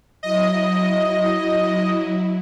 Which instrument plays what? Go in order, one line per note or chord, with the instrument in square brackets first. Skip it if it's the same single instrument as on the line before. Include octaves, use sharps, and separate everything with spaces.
[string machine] F#3 E4 [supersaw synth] D#5